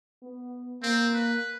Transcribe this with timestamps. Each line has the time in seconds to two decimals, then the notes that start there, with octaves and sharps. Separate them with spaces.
0.23 B3
0.83 A#3 C4
1.14 B4